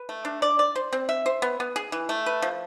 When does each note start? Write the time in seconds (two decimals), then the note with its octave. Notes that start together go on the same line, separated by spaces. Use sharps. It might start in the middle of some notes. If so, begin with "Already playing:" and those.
Already playing: B4
0.09 A3
0.25 D4
0.42 D5
0.59 D5
0.76 C5
0.93 C4
1.09 E5
1.26 C5
1.42 B3
1.60 B3
1.76 G#4
1.92 E3
2.09 A3
2.26 B4
2.42 F3